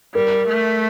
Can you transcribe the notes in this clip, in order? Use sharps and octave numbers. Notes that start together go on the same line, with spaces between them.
G3 A#4
A3